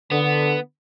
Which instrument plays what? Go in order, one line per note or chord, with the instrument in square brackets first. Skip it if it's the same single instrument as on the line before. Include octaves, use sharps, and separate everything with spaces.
[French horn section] D3 [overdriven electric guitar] B3